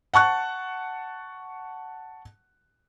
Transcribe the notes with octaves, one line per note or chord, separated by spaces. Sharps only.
F#5 A5 C#6 F#6